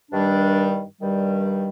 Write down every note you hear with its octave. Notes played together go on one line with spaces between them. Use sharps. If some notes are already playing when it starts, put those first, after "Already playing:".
G2 D#3 G3 D4
G2 D#3 G3